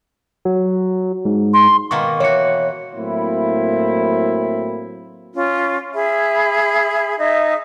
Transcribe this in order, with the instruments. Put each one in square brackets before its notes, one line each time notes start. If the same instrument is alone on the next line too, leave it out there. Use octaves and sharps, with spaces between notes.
[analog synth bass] F#3
G#2
[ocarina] C6
[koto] B2 D#3 A#3 [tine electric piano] C#6
[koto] E3 F#4 [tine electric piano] C#5 C#7
[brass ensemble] A2 F#3 A#3 C4 E4
[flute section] C#4 F4
G#4 E5 B5
D#4 E5